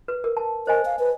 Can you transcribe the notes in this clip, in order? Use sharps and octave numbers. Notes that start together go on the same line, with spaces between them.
B4
A#4
A5
A#4 C5 D#5 G#5
F5
B4